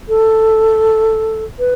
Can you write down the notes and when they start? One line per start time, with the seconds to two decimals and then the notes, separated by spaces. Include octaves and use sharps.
0.09 A4
1.59 B4